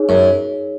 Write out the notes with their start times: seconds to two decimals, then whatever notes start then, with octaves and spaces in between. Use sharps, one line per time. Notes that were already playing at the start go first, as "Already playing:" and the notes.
Already playing: D#4 G#4 C#5
0.09 F#2